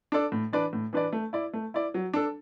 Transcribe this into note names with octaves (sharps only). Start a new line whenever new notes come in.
D4 A4 D5
A2
E3 D4 B4 D5
A2
E3 D4 B4 D5
A3
E4 D5
A3
E4 D5
F#3
D4 A4